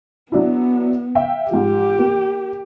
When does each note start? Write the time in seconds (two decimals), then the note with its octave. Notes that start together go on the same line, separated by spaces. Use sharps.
0.32 F#3 B3 D4 E4
1.15 E5 F5 G5
1.51 G#2 F3 G4
1.99 A#3